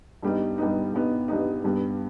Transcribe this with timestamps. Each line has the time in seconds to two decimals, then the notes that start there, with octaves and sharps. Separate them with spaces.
0.22 G2 G3 B3 D#4
0.58 G2 G3 B3 D#4
0.94 G2 G3 B3 D#4
1.28 G2 G3 B3 D#4
1.64 G2 G3 B3